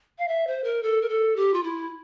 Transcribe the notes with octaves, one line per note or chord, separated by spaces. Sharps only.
F5
E5
C5
A#4
A4
A#4
A4
G4
F4
E4